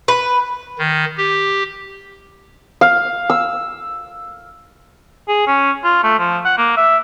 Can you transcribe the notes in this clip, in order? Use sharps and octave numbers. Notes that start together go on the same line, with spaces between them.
B4
D#3
G4
F5
E6
G#4
C#4
F4
A3
F3
F#5
A#3
E5